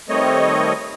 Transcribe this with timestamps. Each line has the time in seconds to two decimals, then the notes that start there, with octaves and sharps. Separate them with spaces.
0.09 D#3 G3 A3 C4 C#5 D#5